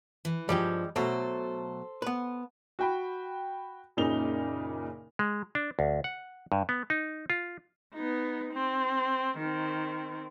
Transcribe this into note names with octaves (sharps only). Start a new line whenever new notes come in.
E3
G2 F3 G3 G#3 G4
B2 F#3 A3 A4 C5
B3 B4
F#4 G5 B5
F#1 A#2 C#3 D#4 F7 G7
G#3
D4
D2
F#5
G2
B3
D#4
F4
B3 D#4
C4
D#3 C4